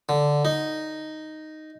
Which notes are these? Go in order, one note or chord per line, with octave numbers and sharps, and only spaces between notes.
D3
D#4